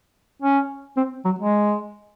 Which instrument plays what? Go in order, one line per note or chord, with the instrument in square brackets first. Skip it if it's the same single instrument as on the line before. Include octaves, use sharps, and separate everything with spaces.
[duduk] C#4
C4
F#3
G#3